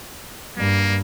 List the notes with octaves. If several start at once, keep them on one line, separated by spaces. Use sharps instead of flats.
G2 A#3